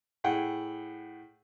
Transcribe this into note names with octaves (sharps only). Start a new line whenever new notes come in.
A2 G#4 F#5 G5